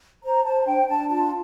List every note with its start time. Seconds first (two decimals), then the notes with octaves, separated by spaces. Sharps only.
0.23 C5 A#5
0.44 C5 A5
0.66 D4 G5
0.88 D4 A5
1.10 F4 A5